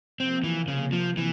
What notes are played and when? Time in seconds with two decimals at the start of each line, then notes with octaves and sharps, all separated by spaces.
0.19 C3 F3 A#3 C4
0.44 E3
0.68 C#3
0.92 F3
1.17 E3